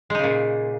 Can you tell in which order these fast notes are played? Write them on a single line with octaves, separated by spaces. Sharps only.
G#3 D#4 C#3 A#2